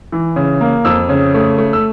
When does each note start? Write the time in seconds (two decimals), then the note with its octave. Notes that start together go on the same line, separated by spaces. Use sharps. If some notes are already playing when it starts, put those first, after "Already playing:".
0.12 E3
0.36 C#3
0.61 A#3
0.85 F2 E6
1.09 C#3
1.34 A3
1.58 A3
1.73 E6